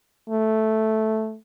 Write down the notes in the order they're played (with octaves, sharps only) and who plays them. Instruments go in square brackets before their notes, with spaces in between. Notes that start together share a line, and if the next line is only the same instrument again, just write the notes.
[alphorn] A3